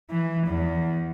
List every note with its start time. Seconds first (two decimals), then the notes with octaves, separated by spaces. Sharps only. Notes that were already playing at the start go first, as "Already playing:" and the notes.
0.10 E3
0.48 E2